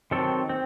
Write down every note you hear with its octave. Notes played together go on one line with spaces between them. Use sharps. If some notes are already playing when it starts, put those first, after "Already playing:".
D#3 F#3 C4 A4
C4